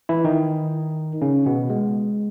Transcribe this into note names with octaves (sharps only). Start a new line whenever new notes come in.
E3 E4
D#3 D#4
C#3 C#4
B2 B3
G#3